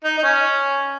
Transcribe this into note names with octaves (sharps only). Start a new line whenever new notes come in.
D#4
D#4
C#4